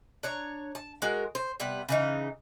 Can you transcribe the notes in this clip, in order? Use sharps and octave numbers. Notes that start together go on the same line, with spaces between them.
D4 C#5 A#5
A5
G#3 F#4 A#4
C5
C3 G3 B3 B4
C#3 E3 D#4